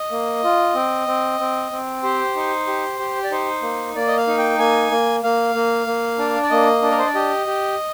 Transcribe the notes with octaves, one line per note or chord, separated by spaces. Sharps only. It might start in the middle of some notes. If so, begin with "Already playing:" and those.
Already playing: D#5
A#3
F4
C4
C4
C4
C4
G4 C5
D#4
G4
G4
D5
D#4 C5
A#3
A#3 D5
D#5
F5
D#4
G5
A#3 G#5
A#3
A#3 F5
A#3
A#3
D4
D5
A#3 D#5
D4
A#4
C5
D5
G4 D#5
G4